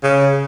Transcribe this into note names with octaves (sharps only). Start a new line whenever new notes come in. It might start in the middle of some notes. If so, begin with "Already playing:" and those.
C#3